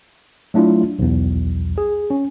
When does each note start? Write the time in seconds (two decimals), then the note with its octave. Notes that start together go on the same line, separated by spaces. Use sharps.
0.54 F#3 A3 D4 E4 F4
0.99 B1 E2
1.78 G#4
2.10 C#4